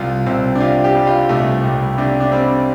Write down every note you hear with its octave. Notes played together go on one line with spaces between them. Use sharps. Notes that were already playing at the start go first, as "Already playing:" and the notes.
Already playing: C2 F4
C2 C4
D4
C3 F4
G4
G3
F4
C2 A3
C2
C3 D4
D4
G3 C4